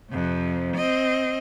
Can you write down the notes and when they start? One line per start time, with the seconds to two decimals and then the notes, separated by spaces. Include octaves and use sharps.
0.11 F2 C3
0.76 C4 D#5